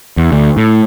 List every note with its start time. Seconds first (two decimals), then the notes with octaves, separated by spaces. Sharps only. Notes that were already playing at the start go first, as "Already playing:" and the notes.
0.17 E2
0.32 D2
0.57 A2